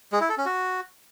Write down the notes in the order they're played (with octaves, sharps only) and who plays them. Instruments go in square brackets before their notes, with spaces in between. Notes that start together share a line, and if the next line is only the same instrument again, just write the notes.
[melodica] G#3
E4
A4
C#4
F#4